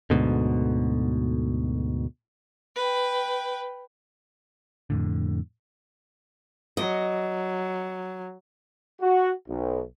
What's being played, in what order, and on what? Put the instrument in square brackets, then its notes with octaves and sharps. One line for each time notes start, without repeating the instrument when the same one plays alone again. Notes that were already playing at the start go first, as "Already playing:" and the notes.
[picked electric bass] D2 G#2 B2 D3
[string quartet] B4 G5
[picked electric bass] F2 A2 D3
[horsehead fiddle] F#3 [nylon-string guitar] D#5
[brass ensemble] F#4
B1